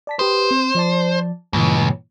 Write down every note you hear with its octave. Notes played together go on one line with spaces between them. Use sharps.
D5 A5 B6
G4 B4 C5 D#6
C4
F3 D5 A5
C#2 G2 A#2 E3